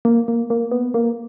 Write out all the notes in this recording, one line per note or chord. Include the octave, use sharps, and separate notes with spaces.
A#3
A#3
A#3
B3
A#3